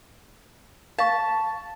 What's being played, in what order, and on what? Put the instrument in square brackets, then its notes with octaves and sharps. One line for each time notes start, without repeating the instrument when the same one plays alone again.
[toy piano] F5 C#6 [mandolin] A5